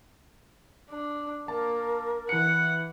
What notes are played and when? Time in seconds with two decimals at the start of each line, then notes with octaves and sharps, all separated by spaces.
0.90 D4
1.48 A#3 A#4 A5
2.29 E3 F#5 C#7